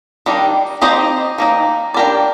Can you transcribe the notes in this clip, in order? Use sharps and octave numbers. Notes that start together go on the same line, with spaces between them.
D#3 G3 D4
C4 D#4 G4 C5 D#5
D#3 A#3 D#4
D4 G4 A#4 D5